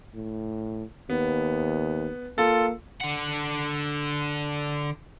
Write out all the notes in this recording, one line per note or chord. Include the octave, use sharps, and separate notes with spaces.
A2
D#2 B3
A#3 F4 A4
D3 F#5